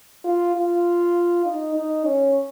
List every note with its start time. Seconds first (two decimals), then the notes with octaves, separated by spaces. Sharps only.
0.24 F4
0.54 F4
1.45 D#4
1.75 D#4
2.05 C#4